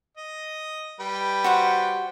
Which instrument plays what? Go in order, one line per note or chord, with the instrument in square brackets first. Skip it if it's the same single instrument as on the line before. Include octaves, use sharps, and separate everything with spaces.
[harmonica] D#5
G3 B4 G5
[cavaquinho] F#4 C5 F#5